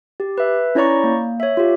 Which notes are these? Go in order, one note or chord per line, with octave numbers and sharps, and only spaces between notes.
G4
B4 E5
C#4 E4 C#5 D5 A#5 C#6
A#3
C#5 E5
F4 G4